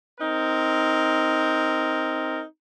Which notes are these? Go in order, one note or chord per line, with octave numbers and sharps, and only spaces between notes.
C4 D#4 A#4